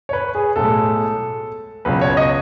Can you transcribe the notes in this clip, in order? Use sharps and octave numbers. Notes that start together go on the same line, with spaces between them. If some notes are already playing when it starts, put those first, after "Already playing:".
C#5
B4
G#4
B1 A2 G#3 A4
C#2 B2 F#3 B4
C#5
D#5